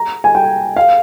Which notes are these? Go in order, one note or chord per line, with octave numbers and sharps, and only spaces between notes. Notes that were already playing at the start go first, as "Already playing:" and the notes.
Already playing: A#5
G#5
G5
F5